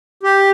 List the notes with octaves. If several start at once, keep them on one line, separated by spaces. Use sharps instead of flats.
G4